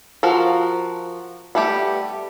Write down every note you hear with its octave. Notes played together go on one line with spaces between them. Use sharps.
F3 F4 F#4 A#4
G3 A3 B3 G4